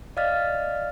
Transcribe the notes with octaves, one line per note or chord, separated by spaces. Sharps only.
D5 D#5 F5 F6 A6